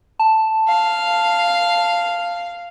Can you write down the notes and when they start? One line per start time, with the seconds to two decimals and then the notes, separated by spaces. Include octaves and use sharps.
0.19 A5
0.68 F5